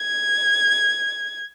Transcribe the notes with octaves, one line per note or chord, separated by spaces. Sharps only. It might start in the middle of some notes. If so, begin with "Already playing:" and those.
Already playing: G#6